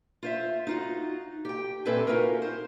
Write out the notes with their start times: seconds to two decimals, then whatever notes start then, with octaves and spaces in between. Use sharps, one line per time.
0.23 F4 C5 E5
0.67 D#4 F4 F#4
1.45 G4 G5
1.85 A#2 C4 A4 B4 E5 G#5
2.07 C#4 D#4 F4 F#4 A#4
2.42 C5